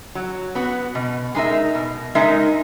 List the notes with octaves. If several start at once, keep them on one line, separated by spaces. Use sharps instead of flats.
F#3
B3 F#4
B2
G#3 D#4 A#4 E5
B2
G#3 D#4 A#4 E5